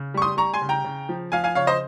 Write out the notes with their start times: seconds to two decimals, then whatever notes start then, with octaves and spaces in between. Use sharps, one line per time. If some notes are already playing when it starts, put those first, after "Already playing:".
Already playing: C#3
0.14 G3 C#6
0.22 C6 D#6
0.37 G3 A#5 C#6
0.54 G#5 C6
0.62 C#3
0.69 G5 A#5
0.84 C#3
1.09 F3
1.32 F3 F5 G#5
1.44 F5 G#5
1.55 C#3 C#5 F5
1.67 C5 D#5